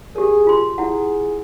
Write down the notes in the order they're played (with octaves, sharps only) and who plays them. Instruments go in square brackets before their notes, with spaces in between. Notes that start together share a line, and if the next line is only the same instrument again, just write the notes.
[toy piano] G4 A#4 [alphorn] G#4
[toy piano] F4 C6
[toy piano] E4 F#5 [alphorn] G#4